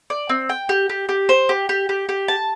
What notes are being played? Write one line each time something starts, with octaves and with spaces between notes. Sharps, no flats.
D5
C4
G5
G4
G4
G4
C5
G4
G4
G4
G4
A5